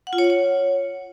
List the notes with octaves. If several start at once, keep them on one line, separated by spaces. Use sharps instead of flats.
F#5
F4
C#5
F#5
C#5